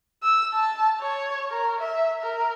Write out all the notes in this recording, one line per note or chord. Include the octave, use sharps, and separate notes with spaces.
E6
A5
C#5
A#4
E5
A#4